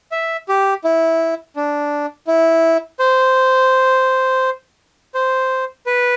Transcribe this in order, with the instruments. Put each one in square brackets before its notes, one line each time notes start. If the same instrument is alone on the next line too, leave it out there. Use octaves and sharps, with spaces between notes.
[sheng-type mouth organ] E5
G4
E4
D4
E4
C5
C5
B4